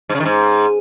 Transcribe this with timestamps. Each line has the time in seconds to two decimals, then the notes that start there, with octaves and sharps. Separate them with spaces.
0.09 G#2
0.15 C#3
0.20 D#3
0.25 G#2